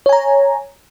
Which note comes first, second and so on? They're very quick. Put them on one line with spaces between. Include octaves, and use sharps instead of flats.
C#5 G#5 A#5